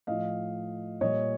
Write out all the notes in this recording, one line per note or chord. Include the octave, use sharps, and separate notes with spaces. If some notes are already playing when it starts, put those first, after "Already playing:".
A2 F3 D#5 F5
A#2 G3 C#5 D#5